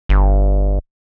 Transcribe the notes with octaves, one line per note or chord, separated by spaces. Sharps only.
G1